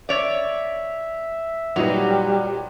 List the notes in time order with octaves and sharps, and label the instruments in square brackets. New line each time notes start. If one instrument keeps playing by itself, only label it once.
[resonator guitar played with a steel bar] C#5 D5 [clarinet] E5
[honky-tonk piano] A#2 D#4 B4 [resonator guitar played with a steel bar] F#3 [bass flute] G3